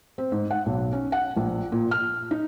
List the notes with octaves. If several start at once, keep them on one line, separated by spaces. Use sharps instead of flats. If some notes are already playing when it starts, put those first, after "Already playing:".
C4
G#2
F#5
B1
C#4
F#5
A#1
A#2
F6
D#4